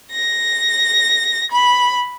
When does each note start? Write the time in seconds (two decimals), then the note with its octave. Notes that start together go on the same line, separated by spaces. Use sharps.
0.12 A#6
1.50 B5